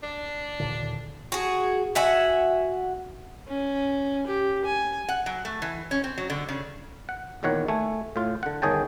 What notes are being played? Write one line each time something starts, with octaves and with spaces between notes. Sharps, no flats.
D4
D#2 A#2 D3
F#4 G#4
F#4 E5 F#5 G#5
C#4
G4
G#5
F#5
F#3
A3
E3
C#4
C4
F#3
D3
C#3
F#5
E2 A#2 D#3 C#5 F#5
A3 G#5
A2 F4
D3 F#5
G1 D#3 G#4 C#5 G5 A5